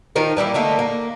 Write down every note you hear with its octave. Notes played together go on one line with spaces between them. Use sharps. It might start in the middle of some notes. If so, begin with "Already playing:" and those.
D#3 F3 D#4 A#4
E3 G3 A#3 E4
D3 A3 A#3 D#4
A#3